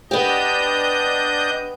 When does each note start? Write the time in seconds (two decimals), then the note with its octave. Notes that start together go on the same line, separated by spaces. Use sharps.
0.11 B3 D4 G4 D#5 G6